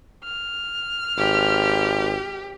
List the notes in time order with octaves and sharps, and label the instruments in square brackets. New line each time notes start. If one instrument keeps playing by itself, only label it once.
[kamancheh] F6
[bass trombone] G#1 [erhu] G4